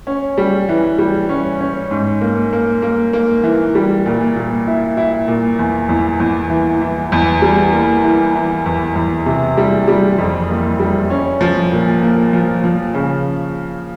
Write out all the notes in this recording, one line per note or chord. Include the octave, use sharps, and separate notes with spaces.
C#4
G3
E3
G3
C#4
C#4
G#2
A#3
A#3
A#3
A#3
E3
G3
A#2
A#2
E4
E4
A#2
E2
E2
E2
E3
E3
E2
G3
A#3
E3
E3
E2
E2
C3
G3
G3
F2
A#3
G3
C#4
F3
A#2
A#3
F3
F3
C#3